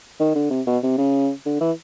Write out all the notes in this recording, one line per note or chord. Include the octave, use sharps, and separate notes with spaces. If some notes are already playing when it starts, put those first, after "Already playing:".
D#3
D3
C3
B2
C3
C#3
D3
E3